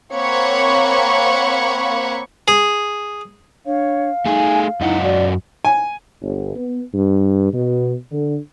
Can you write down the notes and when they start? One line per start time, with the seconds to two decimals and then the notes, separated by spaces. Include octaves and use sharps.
0.14 A#3 C4 C#5 F#5 B5 C#6
2.48 G#4
3.66 D4 C#5 F5
4.26 A3 D#4 G#4 G#5
4.81 F#2 D#4 E4 D#5 F#5
5.02 F#4 D5
5.65 G#5
6.22 G1
6.55 B3
6.94 G2
7.53 B2
8.11 D3